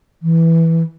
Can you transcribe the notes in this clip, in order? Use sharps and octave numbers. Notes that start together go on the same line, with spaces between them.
E3